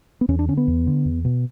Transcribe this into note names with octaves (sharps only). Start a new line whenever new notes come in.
B3
E2 C#4
D4
D3 C#4
B3
E2
D3
E2
B2